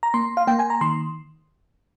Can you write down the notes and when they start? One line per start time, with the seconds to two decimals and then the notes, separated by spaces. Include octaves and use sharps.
0.03 A#5
0.14 A#3 C6
0.37 F5
0.47 A#3 G5
0.59 G#5
0.70 A#5
0.81 D#3 C6